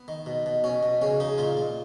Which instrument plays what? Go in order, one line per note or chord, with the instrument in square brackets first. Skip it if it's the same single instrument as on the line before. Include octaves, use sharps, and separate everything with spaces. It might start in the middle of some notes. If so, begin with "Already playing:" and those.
Already playing: [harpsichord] B3
D#3
B2
B2
B2 C#4
B2
C#3 C#4
C#3 D#4
A#2 F4
A#2